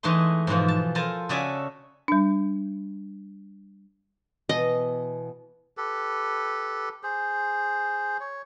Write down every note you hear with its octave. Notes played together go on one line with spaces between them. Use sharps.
E3 G#3 A3 D#4 C6
G#2 B2 E3 F3
A5
A4 A#4 C5 F5 G#5 A5
C#3 F#4 A4 D5 E5 G#5
G3 D4
B2 E3 D#5
G4 A4 B4
G#4 C5
C#5